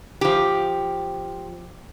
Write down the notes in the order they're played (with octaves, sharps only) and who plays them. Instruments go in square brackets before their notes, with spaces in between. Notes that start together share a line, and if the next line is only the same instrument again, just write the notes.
[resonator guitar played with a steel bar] F3 G4